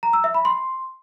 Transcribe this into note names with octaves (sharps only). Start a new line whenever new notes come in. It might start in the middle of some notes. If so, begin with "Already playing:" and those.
A#5
E6
E5
B5
C6